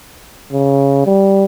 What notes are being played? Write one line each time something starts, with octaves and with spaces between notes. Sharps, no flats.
C#3
G3